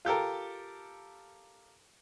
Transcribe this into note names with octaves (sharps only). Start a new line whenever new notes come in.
F4 G4 A4 A#4